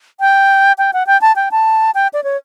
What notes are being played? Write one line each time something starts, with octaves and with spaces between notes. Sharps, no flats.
G5
G5
F#5
G5
A5
G5
A5
G5
D5
C#5